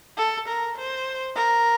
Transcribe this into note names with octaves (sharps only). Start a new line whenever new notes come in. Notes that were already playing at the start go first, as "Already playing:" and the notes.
A4
A#4
C5
A#4